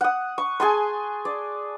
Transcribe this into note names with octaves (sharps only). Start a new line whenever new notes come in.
F#5 D#6
C#6
G#4 G#5 A5 C6
D5